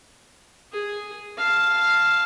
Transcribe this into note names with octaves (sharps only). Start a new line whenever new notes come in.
G#4
F5 A5